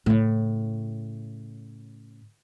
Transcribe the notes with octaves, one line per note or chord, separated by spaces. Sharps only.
A2 C#3